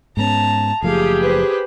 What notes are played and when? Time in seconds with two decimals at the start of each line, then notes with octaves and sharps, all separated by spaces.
0.17 G#2 B3 C#4 A5 A#5
0.82 F#1 F3 A3 G4 G#4 F5
1.21 B4 C5